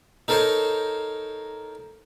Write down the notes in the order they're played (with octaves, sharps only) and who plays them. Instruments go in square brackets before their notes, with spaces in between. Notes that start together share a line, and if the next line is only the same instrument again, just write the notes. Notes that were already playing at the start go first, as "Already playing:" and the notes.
[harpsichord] D#4 A4 A#4 C5 C#5